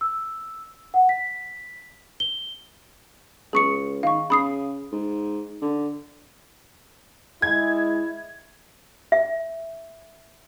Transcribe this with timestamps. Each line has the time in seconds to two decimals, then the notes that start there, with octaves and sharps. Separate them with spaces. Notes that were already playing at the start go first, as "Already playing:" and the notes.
0.01 E6
0.94 F#5
1.09 B6
2.20 G7
3.53 C#2 G#4 C#6 C#7
4.03 D#3 F5 C#6
4.30 C#3 B5 D#6 C7
4.92 G#2
5.62 D3
7.42 G#3 E4 G#6
9.12 E5